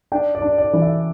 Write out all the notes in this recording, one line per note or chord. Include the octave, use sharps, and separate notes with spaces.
D4 G5
D5
D4
D5
E3
E5